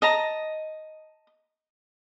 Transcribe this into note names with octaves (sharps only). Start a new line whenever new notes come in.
D#5 A5 A#5